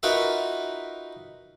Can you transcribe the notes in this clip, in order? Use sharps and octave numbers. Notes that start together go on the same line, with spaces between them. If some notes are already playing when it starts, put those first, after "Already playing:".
D#4 F4 F#4 A#4 B4 E5